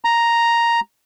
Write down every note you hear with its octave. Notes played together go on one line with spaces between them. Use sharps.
A#5